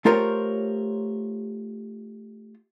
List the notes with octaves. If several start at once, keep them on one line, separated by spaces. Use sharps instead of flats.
A3 F4 G4 A#4 C5 C#5